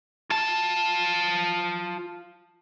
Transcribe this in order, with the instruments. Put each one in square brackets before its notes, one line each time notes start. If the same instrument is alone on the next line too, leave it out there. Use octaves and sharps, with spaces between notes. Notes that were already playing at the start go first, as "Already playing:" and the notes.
[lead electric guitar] F4 A5